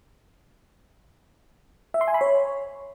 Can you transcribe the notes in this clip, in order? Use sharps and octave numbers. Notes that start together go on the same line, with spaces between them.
E5
C6
G#5
B5
C#5